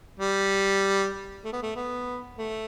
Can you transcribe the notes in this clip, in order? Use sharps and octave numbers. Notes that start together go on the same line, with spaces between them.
G3
A3
B3
A3
B3
A3